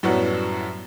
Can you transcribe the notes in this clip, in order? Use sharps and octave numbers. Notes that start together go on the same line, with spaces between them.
F#2 A2 F#3 G3 B3 F#4